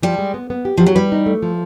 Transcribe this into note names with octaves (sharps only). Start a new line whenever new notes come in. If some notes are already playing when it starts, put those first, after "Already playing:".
F3 G3
G#3
B3
B3
G4
F3 G4
F#3
G3 B4
D#4
A3
F3